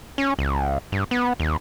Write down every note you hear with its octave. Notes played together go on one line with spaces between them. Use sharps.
C#4
C#2
G2
B3
D#2